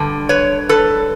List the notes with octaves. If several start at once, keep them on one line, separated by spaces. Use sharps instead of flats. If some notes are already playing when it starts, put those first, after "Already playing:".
Already playing: G2 D3
B4 C#5
A4 B4